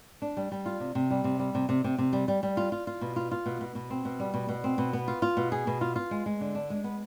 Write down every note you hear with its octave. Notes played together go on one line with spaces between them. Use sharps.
D4
G3
G3
F4
C3
C3
G3
C3
G3
C3
C3
C3
C3
G3
G3
G3
F4
F4
F4
B2
F4
F4
B2
B2
B2
C4
B2
G3
B2
B2
C4
B2
B3
F4
F4
B2
G#4
B2
F4
F4
G#3
G#3
D3
D4
G#3
B3